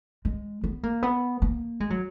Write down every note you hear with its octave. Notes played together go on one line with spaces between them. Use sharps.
G#3
B3
A#3
B3
A#3
G#3
F#3